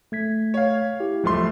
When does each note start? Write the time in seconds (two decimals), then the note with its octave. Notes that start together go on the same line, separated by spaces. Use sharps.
0.12 A3 G#6 B6
0.54 C#5 F5
1.00 E4 G4
1.24 D1 F3 G3 A3 C6